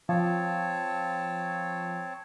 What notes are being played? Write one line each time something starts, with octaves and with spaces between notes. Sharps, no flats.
F3 C4 C#5 A5